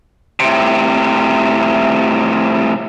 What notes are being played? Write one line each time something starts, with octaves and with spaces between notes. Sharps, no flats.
A2 C3